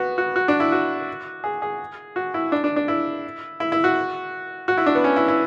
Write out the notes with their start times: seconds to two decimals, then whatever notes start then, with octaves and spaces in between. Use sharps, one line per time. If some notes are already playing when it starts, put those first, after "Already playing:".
Already playing: B3 F#4
0.18 F#4
0.36 F#4
0.48 D4
0.60 E4
0.72 F#4
1.44 G#4
1.62 G#4
2.16 F#4
2.34 E4
2.52 D4
2.64 D4
2.76 D4
2.88 E4
3.60 E4
3.72 E4
3.84 F#4
4.68 F#4
4.78 E4
4.86 D4
4.95 B3
5.04 C#4
5.16 E4
5.28 E4